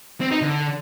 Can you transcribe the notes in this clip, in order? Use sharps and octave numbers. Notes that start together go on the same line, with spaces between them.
C4
D#4
D3